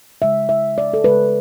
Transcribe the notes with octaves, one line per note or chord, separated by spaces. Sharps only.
C#3 G#3 E5
E5
D5
A4
C#3 G#3 B4